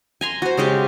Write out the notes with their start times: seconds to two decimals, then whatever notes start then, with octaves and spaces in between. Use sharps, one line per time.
0.21 G#5 A#5 C6
0.42 F#4 C5
0.57 C#3 G#3 G4